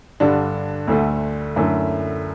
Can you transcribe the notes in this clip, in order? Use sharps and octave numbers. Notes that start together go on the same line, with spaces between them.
G2 D3 G3 D4
D2 D3 A3
F#2 D3 A3 E4